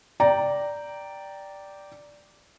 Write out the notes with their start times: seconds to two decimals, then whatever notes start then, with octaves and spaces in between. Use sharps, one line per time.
0.20 D5 G5 A#5